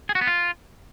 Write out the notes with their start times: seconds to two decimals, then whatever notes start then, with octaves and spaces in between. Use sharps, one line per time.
0.09 G#4
0.15 F#4
0.21 B3
0.27 F4